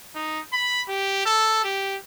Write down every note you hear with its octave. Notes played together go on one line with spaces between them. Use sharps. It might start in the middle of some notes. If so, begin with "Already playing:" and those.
D#4
B5
G4
A4
G4